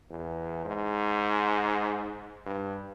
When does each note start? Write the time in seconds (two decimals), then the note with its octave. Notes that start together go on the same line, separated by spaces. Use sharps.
0.10 E2
0.65 G#2
2.46 G2